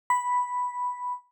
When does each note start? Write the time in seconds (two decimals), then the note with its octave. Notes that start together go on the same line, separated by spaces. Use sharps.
0.10 B5